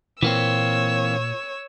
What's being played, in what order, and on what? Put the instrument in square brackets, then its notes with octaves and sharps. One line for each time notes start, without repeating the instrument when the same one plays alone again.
[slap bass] A#2 [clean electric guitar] E3 A#3 C4 [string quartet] C#5 E6